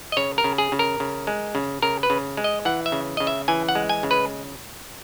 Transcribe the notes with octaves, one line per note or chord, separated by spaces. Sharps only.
D#5
C#3 C#5
A#4
C#3
G#4
C#3
A#4
C#3
G#3
C#3
C#3 A#4
B4
C#3
G#3
D#5
E3 F#5
E5
C#3
C#3 D#5
E5
E3 G#5
F#5
G#3
G#5
C#3
B4